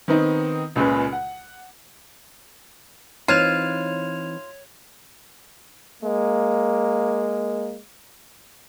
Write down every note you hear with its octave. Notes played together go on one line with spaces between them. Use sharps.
D#3 B3 C4 D#4
C#2 A#2 C#3 G#3 B4
F#5
E3 C4 D#4 F4 C#5 G#6 F7
G#3 A#3